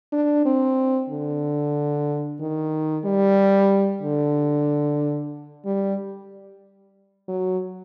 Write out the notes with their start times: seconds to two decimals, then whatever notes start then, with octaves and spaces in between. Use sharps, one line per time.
0.12 D4
0.45 C4
1.10 D3
2.41 D#3
3.05 G3
4.03 D3
5.65 G3
7.29 F#3